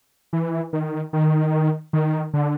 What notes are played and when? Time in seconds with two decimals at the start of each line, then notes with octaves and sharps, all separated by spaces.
0.33 E3
0.73 D#3
1.13 D#3
1.93 D#3
2.33 D3